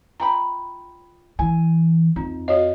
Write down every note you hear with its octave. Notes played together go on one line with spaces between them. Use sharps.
F4 G5 A#5 B5
E3 G#5
F2 D#4
F#4 C#5 D#5 F5